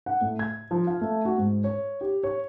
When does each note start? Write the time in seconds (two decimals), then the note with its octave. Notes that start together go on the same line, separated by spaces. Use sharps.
0.06 F#5
0.21 A2
0.39 G#6
0.71 F3
0.87 F5
1.01 A3
1.25 F#4
1.38 G#2
1.64 C#5
2.01 G4
2.23 C#5